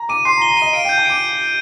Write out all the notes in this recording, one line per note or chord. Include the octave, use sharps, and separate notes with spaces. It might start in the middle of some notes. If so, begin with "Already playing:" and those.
Already playing: A#5
D6 D#7
C6 C7
A#5
G7
A#5
D#5 D#7
F5 D7
G5 G6
G#5
D6 D7